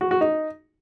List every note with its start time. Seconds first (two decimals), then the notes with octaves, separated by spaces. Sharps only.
0.01 F#4
0.11 F#4
0.21 D#4